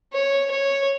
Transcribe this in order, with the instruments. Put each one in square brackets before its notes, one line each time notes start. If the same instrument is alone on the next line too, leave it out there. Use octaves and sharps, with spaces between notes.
[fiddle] C#5
C#5